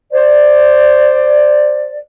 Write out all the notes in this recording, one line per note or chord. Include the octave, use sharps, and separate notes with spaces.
C5 D5